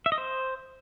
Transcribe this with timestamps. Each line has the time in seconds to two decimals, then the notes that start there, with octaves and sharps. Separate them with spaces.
0.06 E5
0.12 D#5
0.18 C5